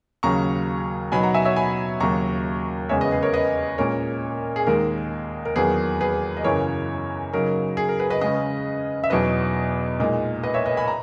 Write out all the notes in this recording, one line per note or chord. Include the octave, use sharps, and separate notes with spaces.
D#2 C#3 F#3 C#4 A#5 C#6
B2 F#3 B3 D#4 G#5 B5
F#5 A#5
E5 G#5
C#5 E5
G#5 B5
D#2 C#3 F#3 A#5 C#6
E2 C#3 G#3 C#4 C#5 E5
B4 D#5
G#4 B4
A#4 C#5
B4 D#5
A#2 G#3 C#4 A#4 C#5
G#4
D#2 D#3 G#3 D#4 A#4
A#4
E2 D#3 F#3 A#3 G#4 B4
G#4 B4
D#5
F#2 C#3 E3 A#4 C#5
C#3 F#3 A#3 D#4 A#4
G#4
A#4
G#4 B4
B4 D#5
C#3 G#3 C#4 B4 D#5
E5
E2 B2 F#3 B3 D#4 B4 D#5
A#2 G#3 D#4
B4 D#5
C#5 E5
B4 D#5
G#5 B5
A#5